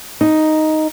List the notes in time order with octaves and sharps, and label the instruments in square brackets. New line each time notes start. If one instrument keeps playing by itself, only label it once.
[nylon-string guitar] D#4